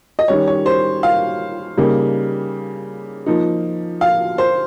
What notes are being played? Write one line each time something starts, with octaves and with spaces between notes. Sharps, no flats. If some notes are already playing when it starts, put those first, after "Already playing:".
D#5
D#3 G3 C#4 C#5
C#5
C5
F5
C#3 G3 A#3 D#4
F3 A#3 D#4
F5
C5